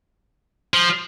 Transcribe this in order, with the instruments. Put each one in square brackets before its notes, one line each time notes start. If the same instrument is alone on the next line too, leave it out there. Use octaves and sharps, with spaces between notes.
[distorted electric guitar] F3